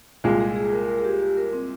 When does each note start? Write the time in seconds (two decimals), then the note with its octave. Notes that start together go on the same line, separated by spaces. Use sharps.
0.24 C2 A#2 G#3 F4
0.40 G#4
0.56 G#4
0.72 A#4
0.88 A#4
0.98 G#4
1.04 G4
1.20 G4
1.37 A#4
1.53 C4